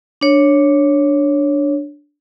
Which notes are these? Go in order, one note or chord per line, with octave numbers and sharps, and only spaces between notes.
D4 C#5